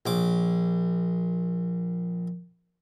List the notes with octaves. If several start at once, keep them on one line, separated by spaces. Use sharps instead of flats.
A#1 D6